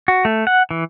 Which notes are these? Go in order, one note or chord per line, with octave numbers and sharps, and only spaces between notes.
F#4
A3
F#5
E3